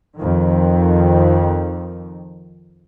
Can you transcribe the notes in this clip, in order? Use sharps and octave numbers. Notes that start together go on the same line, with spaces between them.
F2 D#3